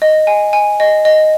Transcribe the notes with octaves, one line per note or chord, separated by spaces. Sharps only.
D#5
G#5
G#5
D#5
D#5